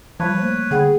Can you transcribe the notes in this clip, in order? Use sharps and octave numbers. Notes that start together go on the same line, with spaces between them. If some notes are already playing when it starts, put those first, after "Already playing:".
F3 G3 B4 C#5 F5 A5
A3 A#3 C5
D3 G#4 F#5 G5